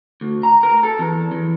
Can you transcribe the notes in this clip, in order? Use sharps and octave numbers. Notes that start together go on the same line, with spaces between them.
D2
A#5
A#4
A4
E2
E2